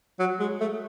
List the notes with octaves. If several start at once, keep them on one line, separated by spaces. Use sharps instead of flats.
F#3
G#3
A3